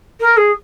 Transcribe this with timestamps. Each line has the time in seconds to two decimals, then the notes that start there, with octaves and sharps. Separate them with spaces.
0.20 A#4
0.37 G#4